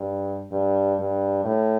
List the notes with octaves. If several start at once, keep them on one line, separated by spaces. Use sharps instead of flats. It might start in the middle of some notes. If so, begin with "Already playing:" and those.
Already playing: G2
G2
G2
A2